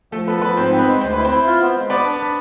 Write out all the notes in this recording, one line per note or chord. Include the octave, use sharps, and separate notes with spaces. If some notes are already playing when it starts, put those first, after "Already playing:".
F3 A3 A4
B3 A4 B4
F3 B3 B4
G#2 C4 C5
C4
B3 B4
G#3
D2 C5
E4 B4
C4 C5
E4
F4
B3
G#3
B3 B4 D5
D4
D4